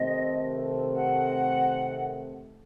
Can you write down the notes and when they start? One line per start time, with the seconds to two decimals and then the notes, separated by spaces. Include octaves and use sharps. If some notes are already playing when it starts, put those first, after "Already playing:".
Already playing: C3 D#3 A3 C4 D#5
0.93 F#5